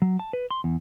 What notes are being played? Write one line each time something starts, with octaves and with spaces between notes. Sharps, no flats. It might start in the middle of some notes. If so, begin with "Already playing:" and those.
F#3
A5
B4
C6
E2